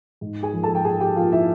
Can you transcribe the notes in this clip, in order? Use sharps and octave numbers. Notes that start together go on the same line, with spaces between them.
G#2
G#4 G#5
F3 A#3
A4 A5
G5
G#2 G#4 G#5
G4 G5
F3 A#3 F4 F5
E4 E5